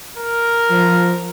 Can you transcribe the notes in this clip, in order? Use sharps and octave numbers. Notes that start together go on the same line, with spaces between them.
A#4
F3